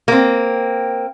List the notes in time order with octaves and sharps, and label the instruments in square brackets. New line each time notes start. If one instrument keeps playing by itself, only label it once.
[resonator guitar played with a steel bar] A#3 C4